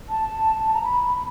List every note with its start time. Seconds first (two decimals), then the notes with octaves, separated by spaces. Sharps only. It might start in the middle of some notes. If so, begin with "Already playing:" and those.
0.09 A5
0.74 A#5
0.83 B5
1.03 B5